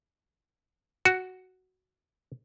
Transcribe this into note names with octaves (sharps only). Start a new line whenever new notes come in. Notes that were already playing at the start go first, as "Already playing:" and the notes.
F#4